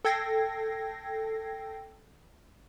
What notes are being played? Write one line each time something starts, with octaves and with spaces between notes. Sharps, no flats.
A4 G5 G#6 A#6 C7